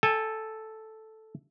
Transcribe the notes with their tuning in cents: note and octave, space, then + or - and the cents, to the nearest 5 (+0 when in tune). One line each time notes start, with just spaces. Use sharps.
A4 +0 G#5 -30